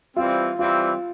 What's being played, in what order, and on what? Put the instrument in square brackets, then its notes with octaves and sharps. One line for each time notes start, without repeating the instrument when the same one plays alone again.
[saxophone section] E3 G3 C4 [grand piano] F4
[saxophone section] E3 G3 C4 [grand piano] F4